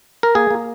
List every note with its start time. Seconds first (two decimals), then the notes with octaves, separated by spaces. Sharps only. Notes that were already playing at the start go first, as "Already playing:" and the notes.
0.23 A#4
0.35 A#3 G#4
0.51 A#3